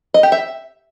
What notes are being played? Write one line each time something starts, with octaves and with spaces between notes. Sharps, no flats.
D#5
G4
E5